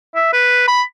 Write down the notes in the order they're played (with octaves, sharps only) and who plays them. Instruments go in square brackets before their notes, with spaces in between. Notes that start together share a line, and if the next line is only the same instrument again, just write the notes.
[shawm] E5
B4
B5